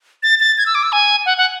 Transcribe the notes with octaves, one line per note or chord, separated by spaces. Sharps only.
A6
A6
G#6
E6
D6
E6
G#5
F#5
F#5